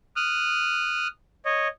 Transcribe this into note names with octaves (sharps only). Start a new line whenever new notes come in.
D#6 F6 F#6
C#5 D#5